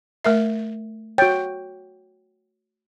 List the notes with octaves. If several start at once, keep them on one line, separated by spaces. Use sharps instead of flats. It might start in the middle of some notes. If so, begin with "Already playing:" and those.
A3 A#4 E5
F#4 C#5 G5